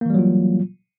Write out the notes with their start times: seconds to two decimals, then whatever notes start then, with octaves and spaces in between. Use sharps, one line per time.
0.01 A#3
0.06 E3
0.10 G3
0.14 F#3
0.19 F4